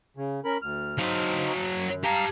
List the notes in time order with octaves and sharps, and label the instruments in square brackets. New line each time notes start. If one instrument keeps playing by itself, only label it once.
[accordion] C#3
C#4 A#4 B5
D2 F6
[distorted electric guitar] F#3 F5 [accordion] C4 D#4
[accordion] F#2
[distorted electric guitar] G4 A5 [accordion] F5 A#5